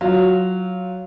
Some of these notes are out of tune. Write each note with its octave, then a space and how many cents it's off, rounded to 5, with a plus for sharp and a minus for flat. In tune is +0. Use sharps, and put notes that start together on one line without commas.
F#3 +0 F4 +0